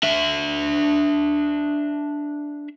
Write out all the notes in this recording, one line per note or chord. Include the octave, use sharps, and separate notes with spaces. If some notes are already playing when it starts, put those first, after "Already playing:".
D4 E5